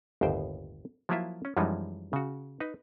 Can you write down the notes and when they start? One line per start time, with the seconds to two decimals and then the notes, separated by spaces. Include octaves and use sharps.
0.21 G1 D#2 A2 C5 G5
1.09 F3 F#3 A#3 E4 F4 E5
1.45 C#4
1.57 F#2 E3 F3 G3 G#3 D#4
2.13 C#3 F#4
2.60 D#4 B4